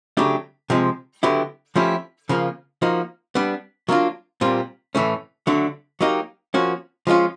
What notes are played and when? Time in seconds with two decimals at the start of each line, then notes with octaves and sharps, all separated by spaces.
0.17 C#3 F#3 A3 D4 G4
0.70 C3 F3 G#3
1.23 D3 F#3 B3 E4 G4
1.76 F3 A3 C#4 E4 G4
2.29 C#3 F3 A#3
2.82 F3 A#3 D#4 F#4
3.35 G3 B3 D4
3.89 F#3 A#3 D4 F4
4.41 A#2 G3 C4 F4
4.95 A2 E3 A3 C#4
5.47 D3 F#3 A3 D4
6.01 F#3 A#3 D#4 G4
6.54 F3 A#3 C#4 F#4
7.07 F3 G#3 C#4 F4